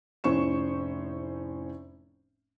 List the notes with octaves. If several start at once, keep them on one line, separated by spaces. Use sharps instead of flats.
F1 A2 C#4 C5 C#6 E7